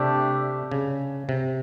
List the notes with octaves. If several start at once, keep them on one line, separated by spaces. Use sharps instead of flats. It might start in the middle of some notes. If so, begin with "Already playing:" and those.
Already playing: C3 A3 D4 G4
C#3
C3